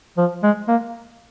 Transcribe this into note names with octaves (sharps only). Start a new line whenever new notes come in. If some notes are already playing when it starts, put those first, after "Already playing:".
F3
G#3
A#3